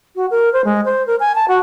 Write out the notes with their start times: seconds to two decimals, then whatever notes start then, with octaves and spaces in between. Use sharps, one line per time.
0.16 F#4
0.31 A#4
0.53 C5
0.65 G#3
0.85 C5
1.07 A#4
1.20 G#5
1.35 A5
1.48 F#4